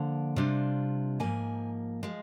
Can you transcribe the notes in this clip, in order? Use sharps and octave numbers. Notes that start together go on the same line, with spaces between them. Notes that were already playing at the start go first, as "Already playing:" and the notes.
Already playing: D3 F3 A#3
C3 G3 D4 F4
G#2 F3 A#3 G#5
F3 G#3